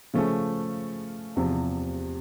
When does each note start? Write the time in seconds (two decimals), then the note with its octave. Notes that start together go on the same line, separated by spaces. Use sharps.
0.14 C#3 F3 A3 C#4
1.36 E2 C3 F3